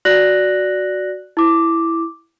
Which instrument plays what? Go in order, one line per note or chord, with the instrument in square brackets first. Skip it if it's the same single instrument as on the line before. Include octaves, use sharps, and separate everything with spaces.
[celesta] F#4 D5 F#6 A#6 F#7
E4 D6